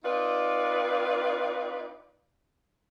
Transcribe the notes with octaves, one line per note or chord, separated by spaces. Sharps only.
C4 D#4 F4 B4 D5